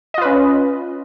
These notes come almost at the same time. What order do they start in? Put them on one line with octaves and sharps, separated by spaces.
D#5 F4 B4 C#4